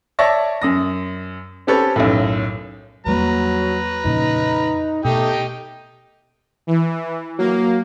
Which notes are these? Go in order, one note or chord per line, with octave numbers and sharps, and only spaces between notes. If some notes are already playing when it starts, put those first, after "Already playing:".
C#5 D5 E5 A5 C#6 A#6
F#2 D#6 A#6
C4 C#4 G4 A4 B4 C#5
B1 F#2 A2
E2 F#3 G3 A#3 B4 A#5
F2 A#2 C#3 D#4
B2 A3 D#4 G4 G5
E3
F#3 A#3